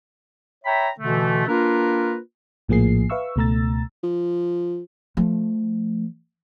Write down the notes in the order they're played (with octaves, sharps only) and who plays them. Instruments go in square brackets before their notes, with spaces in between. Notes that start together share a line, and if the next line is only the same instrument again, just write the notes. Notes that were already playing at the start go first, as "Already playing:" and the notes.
[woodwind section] C#5 E5 G5 A#5 B5
B2 D3 E3 A3
A#3 D4 F4 A#4 B4
[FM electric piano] A#1 A2 F3 A#3 G#4 C7
B4 E5 F5 C#6 E6
C#2 B2 A3 A#5 E6 A6
[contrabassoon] F3
[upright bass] F3 A3